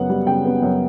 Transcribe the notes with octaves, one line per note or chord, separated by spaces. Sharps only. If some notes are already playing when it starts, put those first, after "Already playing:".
Already playing: F#2 C#3 B3 F#5
G3
C#3 G5
B3
F#2